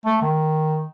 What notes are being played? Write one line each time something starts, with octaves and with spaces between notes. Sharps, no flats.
A3
D#3